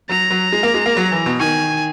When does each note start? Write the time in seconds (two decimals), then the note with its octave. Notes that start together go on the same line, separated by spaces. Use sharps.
0.09 F#3 A#5
0.31 F#3
0.53 G#3
0.63 A#3
0.74 G#3
0.86 A#3
0.97 F#3
1.12 E3
1.26 B2
1.40 D#3 G#5